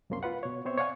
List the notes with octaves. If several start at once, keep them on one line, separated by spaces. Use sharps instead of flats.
C2 F#2 C3 A#3 C#4 C6
F4 B4 F#5
B2 C#5
B3 C4 C5 C#5 E5
C#5 D5 F5 F#5 G#5